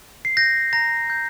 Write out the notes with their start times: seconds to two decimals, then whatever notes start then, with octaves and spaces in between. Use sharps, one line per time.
0.25 C7
0.37 G6 A#6
0.73 A#5 A#6
1.10 G6